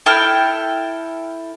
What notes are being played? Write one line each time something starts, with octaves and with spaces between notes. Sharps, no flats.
E4 A4 G5 F6